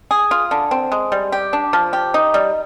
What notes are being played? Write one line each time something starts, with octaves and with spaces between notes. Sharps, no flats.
G#4
F4
D3
C4
G#3
G3
G4
D4
F3
G4
D#4
G3